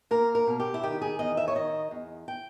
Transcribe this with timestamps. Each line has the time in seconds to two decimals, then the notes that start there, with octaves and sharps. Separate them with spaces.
0.11 A#3 A#4
0.35 A#4
0.47 B2
0.60 G4
0.74 E4
0.83 D#3 G4
1.02 G#4
1.19 E2 D#5
1.37 E5
1.48 C#5
1.55 D#3 D#5
1.91 E2
2.28 G5